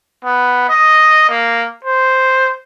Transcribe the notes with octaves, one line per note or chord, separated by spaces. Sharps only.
B3
D#5
A#3
C5